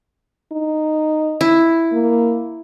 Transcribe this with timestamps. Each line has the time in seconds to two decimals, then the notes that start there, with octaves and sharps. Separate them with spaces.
0.52 D#4
1.41 E4
1.92 A#3